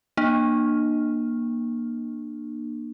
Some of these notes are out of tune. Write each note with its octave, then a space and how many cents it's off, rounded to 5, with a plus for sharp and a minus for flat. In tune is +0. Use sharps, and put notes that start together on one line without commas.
A#3 +20 D4 +40